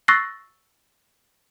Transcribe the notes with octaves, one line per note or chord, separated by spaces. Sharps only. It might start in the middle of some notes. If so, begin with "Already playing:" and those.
C#6 E6 F#6 A6 A#6 C7